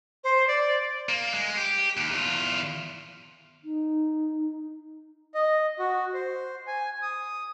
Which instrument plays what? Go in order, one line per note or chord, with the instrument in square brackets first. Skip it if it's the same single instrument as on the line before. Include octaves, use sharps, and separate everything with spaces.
[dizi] C5
D5
[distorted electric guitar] A#3
G#3
G4
D#2
E2 F4
[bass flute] D#4
[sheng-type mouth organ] D#5
F#4
C5
G#5
D#6